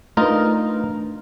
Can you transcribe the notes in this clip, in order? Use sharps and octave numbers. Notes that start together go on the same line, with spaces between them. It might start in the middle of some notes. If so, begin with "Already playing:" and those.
A3 D4 D#4 F4 A#4 B4